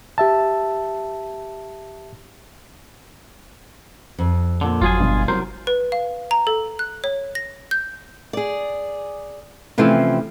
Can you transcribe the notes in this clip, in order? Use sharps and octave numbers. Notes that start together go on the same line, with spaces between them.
G4 E5 A5
F2
A#2 D3
G1 F3 F#3 F4 G#4 G#5
G2 B2
C2 F#3 A#4 C5
B4
F5
A#5
A4
F#6
C#5
A#6
G6
G#4 D5
C3 E3 F3 A3 C4 C#4